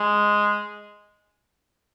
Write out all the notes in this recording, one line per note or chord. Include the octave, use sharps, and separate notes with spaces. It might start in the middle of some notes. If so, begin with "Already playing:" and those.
Already playing: G#3